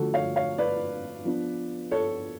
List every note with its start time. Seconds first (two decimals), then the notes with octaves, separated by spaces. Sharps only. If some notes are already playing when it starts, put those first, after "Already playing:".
Already playing: D3 F3 A3 F#4 A4
0.14 C#5 F5
0.36 C#5 F5
0.58 B4 D5
1.25 F3 B3 D4
1.91 A4 C#5